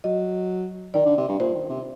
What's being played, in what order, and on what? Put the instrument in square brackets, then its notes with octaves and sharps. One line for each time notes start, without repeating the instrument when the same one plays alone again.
[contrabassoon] F#3 [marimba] D#5
[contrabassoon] D#3 [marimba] D5
[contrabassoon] D3
C3
G2
[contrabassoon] A#2 [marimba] C5
[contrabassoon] D#3
C3